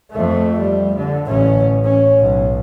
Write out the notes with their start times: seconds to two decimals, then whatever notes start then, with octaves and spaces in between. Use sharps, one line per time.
0.11 F2 A3
0.59 G3
0.97 D3
1.27 A1 C#4
1.84 C#4
2.19 B1